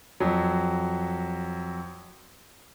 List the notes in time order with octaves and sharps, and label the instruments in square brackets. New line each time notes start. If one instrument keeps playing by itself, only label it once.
[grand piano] F2 F#3